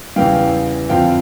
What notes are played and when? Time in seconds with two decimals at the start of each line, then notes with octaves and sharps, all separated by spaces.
0.16 E2 C#3 E3 G3 F5 G5
0.89 F2 D3 F3 F5 G5